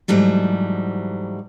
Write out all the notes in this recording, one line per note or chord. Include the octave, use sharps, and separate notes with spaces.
G#2 E3 F#3 G3 A3